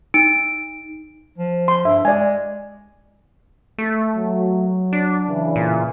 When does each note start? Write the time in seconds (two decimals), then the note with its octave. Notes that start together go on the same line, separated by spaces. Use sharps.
0.14 D#4 D7
1.38 F3
1.68 C6
1.85 G2 E5
2.05 G#3 D5 G#5
3.78 A3
4.16 F#3
4.93 D4
5.28 C#3 E3
5.56 A#2